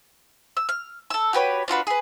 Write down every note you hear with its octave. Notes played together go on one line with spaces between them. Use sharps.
E6
F6
A4 E6
F#4 G4 B4 C#5
D4 F4 F#4 B4
G#4 B4